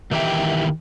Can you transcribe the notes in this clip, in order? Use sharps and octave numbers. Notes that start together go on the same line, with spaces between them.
D#3 E3 G4 C5 E5 G5